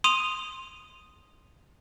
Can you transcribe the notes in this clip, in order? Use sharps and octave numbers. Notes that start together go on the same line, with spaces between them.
C6 D#6 D#7 F7